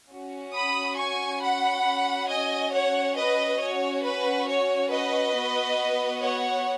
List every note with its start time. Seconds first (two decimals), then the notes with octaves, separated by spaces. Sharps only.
0.10 C#4 F#4
0.53 B5 D#6
0.98 G#5 C#6
1.41 F#5 B5
1.85 C#4 F#4
2.29 D#5 G#5
2.73 C#5 F#5
3.16 B4 D#5
3.60 C#4 F#4 C#5
4.04 B4
4.48 C#5
4.91 B4 D#5
5.35 B3 F#4
6.23 C#5 F#5